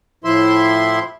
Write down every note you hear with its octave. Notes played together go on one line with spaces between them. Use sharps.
A2 F3 E4 E5 C6